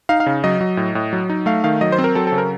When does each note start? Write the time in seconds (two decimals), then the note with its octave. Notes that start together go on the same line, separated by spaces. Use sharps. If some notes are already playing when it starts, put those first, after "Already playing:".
0.09 D#4 F5
0.20 F5
0.26 C#3
0.44 F#3 D#5
0.61 F#3
0.77 A2
0.95 A2
1.13 F#3
1.30 D#4
1.46 A3 F5
1.64 D#3 F5
1.81 F#3 D#5
1.92 C5
1.98 C4
2.04 A#4
2.15 F#3 A4
2.27 C#3 A4
2.38 A#4